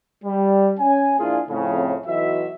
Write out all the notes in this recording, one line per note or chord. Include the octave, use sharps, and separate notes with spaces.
G3
C#4 G#5
A#2 F3 D4 E4 F4 G#4
F2 A2 C#3
B1 E3 F#4 D#5 E5